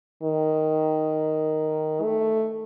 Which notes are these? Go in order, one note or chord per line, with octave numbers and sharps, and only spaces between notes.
D#3
A3